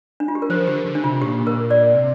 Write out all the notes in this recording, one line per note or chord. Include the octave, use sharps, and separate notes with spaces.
D4
F4
G4
A#4
F3 C5
D3 G4
D3
D4
C3 F4
A#2 G4
A#4
D5
C3